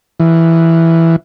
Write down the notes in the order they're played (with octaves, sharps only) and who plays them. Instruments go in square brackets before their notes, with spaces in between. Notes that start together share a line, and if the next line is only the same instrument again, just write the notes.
[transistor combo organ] E3